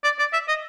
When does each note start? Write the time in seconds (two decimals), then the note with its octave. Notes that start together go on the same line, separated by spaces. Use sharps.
0.04 D5
0.19 D5
0.33 E5
0.48 D#5